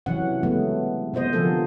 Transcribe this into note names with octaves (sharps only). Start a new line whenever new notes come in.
C3 E3 F#3 C#4 F#5
C#3 F#3 G#3 A3 B3
C3 B3 C5 D#5
D3 F3 A#3 G#4 A4